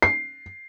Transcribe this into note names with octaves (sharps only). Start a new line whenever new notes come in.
C7